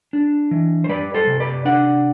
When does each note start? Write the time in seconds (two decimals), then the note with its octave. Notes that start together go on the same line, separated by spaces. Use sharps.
0.13 D4
0.51 E3
0.84 C5
0.89 G3 B4 D5
1.15 A4 C5
1.27 C3
1.40 B4 D5
1.65 D4 D5 F#5